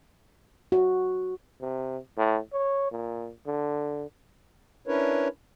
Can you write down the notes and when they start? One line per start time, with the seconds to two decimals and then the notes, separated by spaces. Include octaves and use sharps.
0.72 F#4
1.61 C3
2.18 A2
2.53 C#5
2.92 A#2
3.47 D3
4.87 C#4 D4 E4 A#4 B4 C#5